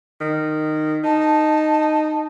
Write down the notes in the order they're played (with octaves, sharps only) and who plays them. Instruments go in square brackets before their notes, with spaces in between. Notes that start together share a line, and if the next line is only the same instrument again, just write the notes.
[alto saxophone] D#3
[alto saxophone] D#4 [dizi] A5